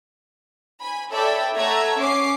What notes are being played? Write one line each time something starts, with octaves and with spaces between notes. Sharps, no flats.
G#5 B5
A4 C#5 D5 E5 G5 B5
A3 C#5 E5 F#5 A#5 G#6
C#4 D6 C7